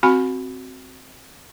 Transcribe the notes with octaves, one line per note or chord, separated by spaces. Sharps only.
C4 F#4 G#5 B5